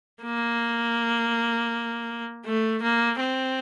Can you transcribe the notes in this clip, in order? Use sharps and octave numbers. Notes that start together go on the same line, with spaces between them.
A#3
A3
A#3
C4